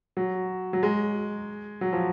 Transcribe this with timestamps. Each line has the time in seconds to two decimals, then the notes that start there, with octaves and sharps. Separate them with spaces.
0.17 F#3
0.73 F#3
0.83 G#3
1.81 F#3
1.93 F3